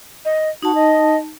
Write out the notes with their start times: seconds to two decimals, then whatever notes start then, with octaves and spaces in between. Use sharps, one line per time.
0.25 D#5
0.62 D#4 F#4 A5
0.75 D#5